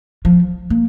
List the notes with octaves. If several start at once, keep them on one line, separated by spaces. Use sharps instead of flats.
F3
A#3